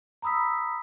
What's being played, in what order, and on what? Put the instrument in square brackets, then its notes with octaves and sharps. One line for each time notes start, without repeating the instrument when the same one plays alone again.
[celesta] A#5 B5 D#6 E6 B6